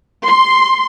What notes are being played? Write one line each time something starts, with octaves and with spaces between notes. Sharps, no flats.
C6